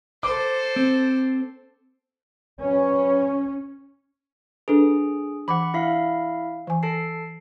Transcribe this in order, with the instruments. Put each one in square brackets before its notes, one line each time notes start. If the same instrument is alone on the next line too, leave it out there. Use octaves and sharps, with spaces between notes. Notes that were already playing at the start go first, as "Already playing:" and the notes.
[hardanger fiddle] A4 C5 [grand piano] D6
[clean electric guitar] C4
[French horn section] F#3 B4 C#5 [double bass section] C#4
[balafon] D4 A4 B4 [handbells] G#4
[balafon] E3 D6 [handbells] F#5 B5
[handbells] E4 E5 F5
[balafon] E3 G#5
[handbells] A4 A5 C7